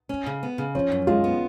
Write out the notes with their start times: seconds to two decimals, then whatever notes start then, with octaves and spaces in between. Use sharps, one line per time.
0.09 C#4
0.26 C#3
0.43 B3
0.58 C#3
0.75 F3 C#4
0.92 F#2
1.07 G#3 F4
1.24 B3